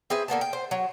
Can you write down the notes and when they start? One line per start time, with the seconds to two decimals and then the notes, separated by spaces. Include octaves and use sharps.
0.10 C4 G#4 B4 E5
0.28 D3 A#3 B3 A5
0.41 G5
0.53 C5
0.71 F#3